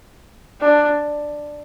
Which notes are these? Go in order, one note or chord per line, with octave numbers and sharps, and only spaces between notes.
D4